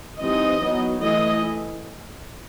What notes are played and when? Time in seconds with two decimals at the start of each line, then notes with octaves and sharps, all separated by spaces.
0.19 E3 G3 C4 D#4 D#5
0.62 F#3 B3 D#4
1.02 E3 A3 E4 D#5